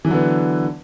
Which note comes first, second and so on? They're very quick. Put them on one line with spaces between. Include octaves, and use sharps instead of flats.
E3 F#3 D3 B3